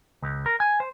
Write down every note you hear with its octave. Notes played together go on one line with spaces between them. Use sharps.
C#2
A#4
G#5
C5